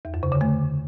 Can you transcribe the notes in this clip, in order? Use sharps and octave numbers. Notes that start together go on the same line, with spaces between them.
E2
F#2
C#3
D3
A3